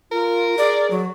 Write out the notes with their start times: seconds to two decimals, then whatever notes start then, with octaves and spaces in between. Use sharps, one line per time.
0.12 F4 A#4
0.58 G#4 D5
0.91 F#3